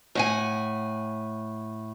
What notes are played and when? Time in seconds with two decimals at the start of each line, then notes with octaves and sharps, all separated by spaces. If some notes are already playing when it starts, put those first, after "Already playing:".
0.15 A2 F#5 G#5